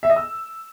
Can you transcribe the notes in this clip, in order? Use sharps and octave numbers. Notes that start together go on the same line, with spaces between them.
E5
D#5
E6